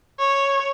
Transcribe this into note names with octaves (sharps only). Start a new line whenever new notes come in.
C#5